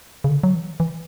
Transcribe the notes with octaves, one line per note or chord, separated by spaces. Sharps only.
C#3
D3
F#3
E3
E3